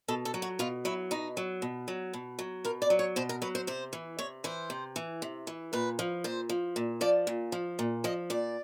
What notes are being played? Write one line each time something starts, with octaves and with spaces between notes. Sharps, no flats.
B2 A4
A4
F#3
F#4
B2 F4
F#3 E4
B2 D#4
F#3
B2
F#3
B2
F#3
B2 A#4
D5
F#3
C#5
B2 C5
A#4
F#3 B4
C5
C3 C5
E3
C3 C#5
E3 C5
C3
E3
C3
E3
A#2 B4
F3
A#2 C5
F3
A#2
F3 D5
A#2
F3
A#2
F3 D#5
A#2 D5